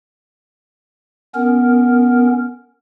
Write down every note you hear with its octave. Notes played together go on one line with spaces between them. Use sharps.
B3 C#4 A#4